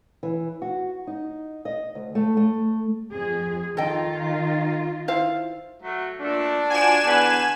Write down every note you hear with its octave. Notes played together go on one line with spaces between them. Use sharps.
E3
F#4
D#4
D#5
D2
A3
A3
F2 G#4
D#3 F4 A4 D#5 G5
E4 C5 F5
F#3 A3
A#2 A3 D4 A4
F3 F#4 D5 G#5 E7
E2 D3 B4